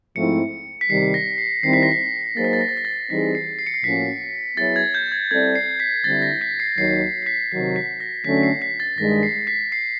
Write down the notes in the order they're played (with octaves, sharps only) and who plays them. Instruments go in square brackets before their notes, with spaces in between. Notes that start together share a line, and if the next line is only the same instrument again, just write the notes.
[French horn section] G#2 F3 A3 C4 E4 [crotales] C#7
[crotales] B6
[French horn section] C3 D#3 G3 [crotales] C7
[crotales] A#6
C7
[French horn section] D#3 G3 C4 E4 [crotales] C7
[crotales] B6
A#6
B6
[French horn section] F#3 A#3 D#4 G#4 C5 [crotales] A6
[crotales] A#6
A6
A#6
A6
A#6
A6
[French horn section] E3 G3 C4 D#4 G#4 [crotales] B6
[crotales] C7
C7
C#7
C7
[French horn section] A2 F3 A#3 C#4 F#4 [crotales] B6
[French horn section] F#3 B3 E4 G#4 C#5 [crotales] A6
[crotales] G#6
G6
G#6
[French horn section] G3 C4 E4 A4 D5 [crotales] G#6
[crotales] C7
B6
[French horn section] D3 G3 C4 E4 [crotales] A6
[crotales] A#6
B6
C7
[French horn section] D#2 D#3 F#3 [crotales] C7
[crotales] C7
B6
[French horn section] C3 D#3 F#3 [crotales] C7
[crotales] B6
A#6
[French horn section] D3 F#3 A3 C#4 [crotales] B6
[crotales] B6
C7
B6
A6
[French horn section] G2 D#3 G#3 [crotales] A#6
[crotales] C7
B6
C7